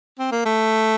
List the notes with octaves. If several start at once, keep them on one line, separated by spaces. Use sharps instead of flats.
C4
A#3
A3